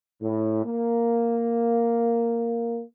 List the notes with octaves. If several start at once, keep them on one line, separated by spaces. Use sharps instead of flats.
A2
A#3